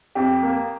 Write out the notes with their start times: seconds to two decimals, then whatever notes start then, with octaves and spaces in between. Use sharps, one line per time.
0.15 F2 G4
0.43 A#3